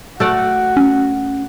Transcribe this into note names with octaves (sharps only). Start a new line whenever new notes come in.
A3 F#4 D5 F#5
C#4